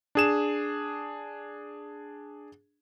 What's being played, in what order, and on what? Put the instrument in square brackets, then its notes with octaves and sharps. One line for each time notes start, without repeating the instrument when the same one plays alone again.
[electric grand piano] D4 G#4 E7